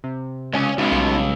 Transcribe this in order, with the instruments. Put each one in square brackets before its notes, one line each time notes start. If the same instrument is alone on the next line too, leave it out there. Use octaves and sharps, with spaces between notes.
[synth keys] C3
[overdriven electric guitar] C#2 [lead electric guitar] C#5 G#5
[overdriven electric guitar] C#2 C#3 [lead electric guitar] D#4 F#4 [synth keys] E5
[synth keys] B1 G3 A5